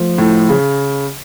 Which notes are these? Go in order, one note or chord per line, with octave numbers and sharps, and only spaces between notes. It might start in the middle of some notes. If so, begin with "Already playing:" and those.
Already playing: F3 A3
A2
C#3